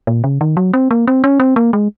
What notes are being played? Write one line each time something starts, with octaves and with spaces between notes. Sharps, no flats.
A#2
C#3
D#3
F#3
C4
A#3
C4
C#4
C4
A#3
G#3